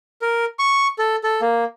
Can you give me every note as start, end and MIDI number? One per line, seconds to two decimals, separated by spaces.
0.22 0.45 70
0.59 0.87 85
0.99 1.16 69
1.24 1.41 69
1.41 1.64 58